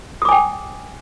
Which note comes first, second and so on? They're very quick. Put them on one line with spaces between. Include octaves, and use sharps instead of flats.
D#6 D6 G#5 G5